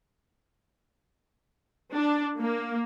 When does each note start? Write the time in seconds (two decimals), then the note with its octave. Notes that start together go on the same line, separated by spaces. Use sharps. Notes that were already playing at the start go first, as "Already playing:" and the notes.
1.94 D4
2.39 A#3